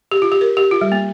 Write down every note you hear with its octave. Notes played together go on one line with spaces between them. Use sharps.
G4
F4
G4
A#4
G4
F4
G3
A#3